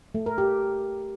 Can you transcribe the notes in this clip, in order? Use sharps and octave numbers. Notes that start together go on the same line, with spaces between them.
A3
A#4
G4